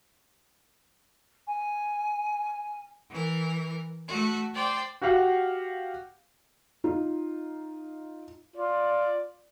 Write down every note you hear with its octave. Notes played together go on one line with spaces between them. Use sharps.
G#5
E3 A#4
A3 F#4
C5 D5 G5 C6
F#4 G4 F5 F#5
D#4 F4
F4 D5